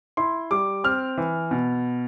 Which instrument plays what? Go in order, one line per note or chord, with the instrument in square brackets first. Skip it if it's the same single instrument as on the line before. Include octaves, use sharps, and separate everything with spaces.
[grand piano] E4 C6
G3 D6
C4 F6
E3
B2